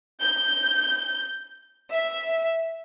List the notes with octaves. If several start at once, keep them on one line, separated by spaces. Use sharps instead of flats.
G6
E5